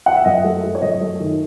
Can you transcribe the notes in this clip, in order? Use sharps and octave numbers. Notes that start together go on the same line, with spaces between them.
F#5
E5
F#2 D#5
A3
A3
C#5
F#2 D#5
A3
D#3